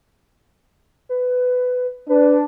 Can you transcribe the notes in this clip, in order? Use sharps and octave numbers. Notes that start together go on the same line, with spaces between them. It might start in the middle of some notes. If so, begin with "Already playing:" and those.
B4
D4 B4